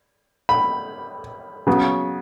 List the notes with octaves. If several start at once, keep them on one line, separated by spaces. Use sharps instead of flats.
B5
C#3 F#3 B3